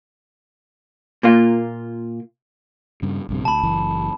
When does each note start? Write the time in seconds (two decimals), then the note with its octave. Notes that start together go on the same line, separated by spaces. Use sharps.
1.23 A#2 A#3 F4
3.02 G2 C#3
3.29 A#1 G2 C3
3.45 D2 A5 B5
3.63 F#1 E3